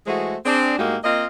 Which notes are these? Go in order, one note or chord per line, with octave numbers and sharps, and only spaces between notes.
E3 G#3 A3 F#4 G#4 C5
C4 D4 G#4
A2 G#3 A#3 D#4 F#4 G4
A#3 C4 F4 D#5